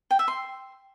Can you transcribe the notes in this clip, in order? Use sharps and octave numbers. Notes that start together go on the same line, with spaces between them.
G5
E5
C6